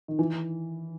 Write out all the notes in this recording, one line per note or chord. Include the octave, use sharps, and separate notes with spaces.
D#3
E3